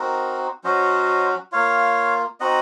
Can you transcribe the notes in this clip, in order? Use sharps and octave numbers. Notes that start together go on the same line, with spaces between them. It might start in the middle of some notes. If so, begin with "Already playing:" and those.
Already playing: C4 D#4 F#4 A#4
F#3 C#4 F#4 C5 D#5
A#3 F4 C#5 F5
C4 D#4 F#4 D#5 F#5